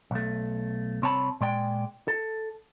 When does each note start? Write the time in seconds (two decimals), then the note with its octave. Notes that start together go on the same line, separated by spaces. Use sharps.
0.11 B1 A3
1.02 C2 C4 C#5 A5 B5
1.41 A#2 G#3 D5 G5
2.08 A4